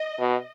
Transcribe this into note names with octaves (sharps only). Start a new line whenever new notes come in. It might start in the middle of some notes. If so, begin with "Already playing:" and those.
Already playing: D#5
B2